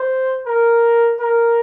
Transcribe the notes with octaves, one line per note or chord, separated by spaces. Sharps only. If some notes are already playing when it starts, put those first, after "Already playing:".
Already playing: C5
A#4
A#4